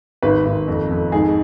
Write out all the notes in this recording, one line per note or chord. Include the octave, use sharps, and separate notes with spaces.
G#1 B4
G#1
F2
F2
G#2 G#4